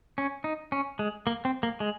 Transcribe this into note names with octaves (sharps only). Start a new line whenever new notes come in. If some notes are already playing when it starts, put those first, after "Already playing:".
C#4
D#4
C#4
G#3
A#3
C4
A#3
G#3